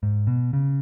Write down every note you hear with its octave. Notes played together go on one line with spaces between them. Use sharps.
G#2
B2
C#3